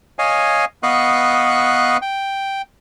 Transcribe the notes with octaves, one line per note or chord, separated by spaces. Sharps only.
C#5 D#5 F5 G#5
B3 B4 D#5 F5 C#6 F#6
G5